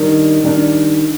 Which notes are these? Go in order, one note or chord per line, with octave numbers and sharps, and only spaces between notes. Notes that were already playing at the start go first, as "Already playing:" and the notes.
Already playing: D#3 G3 D4
D#3 G3 D4